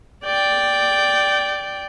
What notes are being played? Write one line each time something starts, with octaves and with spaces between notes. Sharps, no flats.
D5 G5